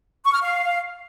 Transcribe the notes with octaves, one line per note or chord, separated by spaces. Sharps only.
C#6
F6
F5